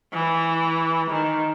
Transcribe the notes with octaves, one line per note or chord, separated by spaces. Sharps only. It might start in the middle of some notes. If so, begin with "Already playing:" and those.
E3
D#3